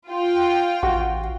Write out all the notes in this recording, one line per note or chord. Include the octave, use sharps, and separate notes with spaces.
F4 G5
A1 F#4